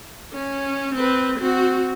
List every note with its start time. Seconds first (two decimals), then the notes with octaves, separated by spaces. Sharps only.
0.33 C#4
0.95 C4 B4
1.38 C4 F#4